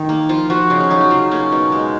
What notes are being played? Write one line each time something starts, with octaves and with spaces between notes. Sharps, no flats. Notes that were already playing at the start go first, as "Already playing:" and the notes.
Already playing: D#3 D#4
A#3
F3 F4
F3 F#4
C#3 D#4
C#4
F#3 D#4
F#4
C#3 F4
A#3 C#4
B2 D#4
G#3